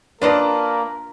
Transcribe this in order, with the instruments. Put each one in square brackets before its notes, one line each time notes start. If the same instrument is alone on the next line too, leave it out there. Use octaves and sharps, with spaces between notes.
[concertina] A#3 [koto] D4 F4 D#5 [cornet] A#4 [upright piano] B4 D5 A5